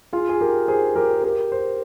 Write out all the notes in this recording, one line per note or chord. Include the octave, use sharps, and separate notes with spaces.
F4 G#4
G#4
G4 A#4
G#4 C5
G4 A#4
G#4
G4 A#4
C5